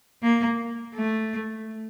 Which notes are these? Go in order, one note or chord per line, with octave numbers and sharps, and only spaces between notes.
A#3
A3